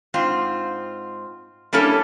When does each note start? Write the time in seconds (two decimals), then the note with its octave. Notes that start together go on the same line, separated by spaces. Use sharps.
0.14 G#2 C4 F4
1.73 G3 A#3 C#4 E4 A4